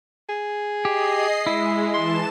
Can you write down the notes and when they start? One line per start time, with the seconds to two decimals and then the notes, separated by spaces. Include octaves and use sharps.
0.29 G#4
0.85 G4 D#5 C7
1.46 G#3 E4
1.94 E3 A5 C6 E7